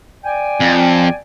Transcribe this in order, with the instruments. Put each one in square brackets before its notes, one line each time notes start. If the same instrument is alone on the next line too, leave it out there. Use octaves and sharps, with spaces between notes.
[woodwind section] D5 G5 G#5
[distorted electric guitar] F2